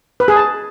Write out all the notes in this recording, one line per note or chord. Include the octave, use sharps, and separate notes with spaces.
B4
G#4
A5